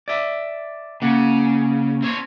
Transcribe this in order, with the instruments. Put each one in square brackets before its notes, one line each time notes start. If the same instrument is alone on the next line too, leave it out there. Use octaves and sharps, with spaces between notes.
[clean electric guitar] D5 E5
[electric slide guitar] C#3 [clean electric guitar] A#3 F#5
[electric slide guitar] C4 C#5